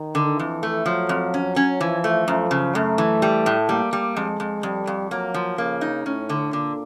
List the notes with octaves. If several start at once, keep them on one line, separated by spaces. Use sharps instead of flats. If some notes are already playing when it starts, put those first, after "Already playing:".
Already playing: D#3
D3
F2 E3
A3
F3 F#3
F2
C#4
C#4
E3 F3
A3
F#2 F3
C#3
F#2 A3
E3
G3
A2
G3 A#3
G3
F2 G#3
F2
F2 G3
F2
F#3 A#3
F3
C#3 A#3
D#4
A2 C#4
D3
A#2 D3